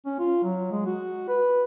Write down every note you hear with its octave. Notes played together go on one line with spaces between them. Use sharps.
C#4
F4
F#3
G#3
F#4
B4